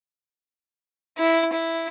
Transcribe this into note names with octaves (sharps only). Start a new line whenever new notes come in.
E4
E4